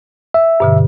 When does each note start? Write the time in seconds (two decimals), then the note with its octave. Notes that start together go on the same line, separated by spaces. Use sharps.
0.34 E5
0.60 G2 B2 D3